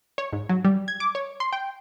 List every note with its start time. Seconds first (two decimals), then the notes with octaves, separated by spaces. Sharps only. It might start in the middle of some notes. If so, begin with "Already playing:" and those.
0.18 C#5
0.33 G#2
0.49 F#3
0.65 G3
0.88 G#6
1.00 D6
1.15 C#5
1.40 C6
1.53 G5